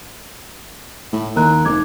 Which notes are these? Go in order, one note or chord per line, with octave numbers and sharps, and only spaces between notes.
A2
D#2 A#4 A#5 F#6
F1 D#4 D6 G#6